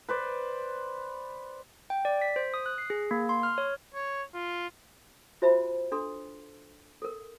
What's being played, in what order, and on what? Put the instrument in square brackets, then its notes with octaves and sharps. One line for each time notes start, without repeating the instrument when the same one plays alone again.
[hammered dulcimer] B4 C5 D5
[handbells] G5
D5
B6
C5
D#6
F#6
C7
G#4
A#3
C6
F6
C#5
[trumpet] C#5
F4
[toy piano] F4 F#4 C5 E5 A5 B5
D4 A4 C6
A4 A#4